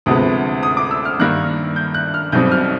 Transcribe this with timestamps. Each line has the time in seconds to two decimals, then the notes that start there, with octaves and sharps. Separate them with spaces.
0.06 D2 C3 F3 G#3 B3 D#6
0.63 D#6
0.77 D6
0.91 E6
1.05 F6
1.19 G2 D#3 G3 A#3 F#6
1.76 G6
1.95 F#6
2.14 F6
2.32 B1 B2 G3 C4 D#4 G6
2.52 F6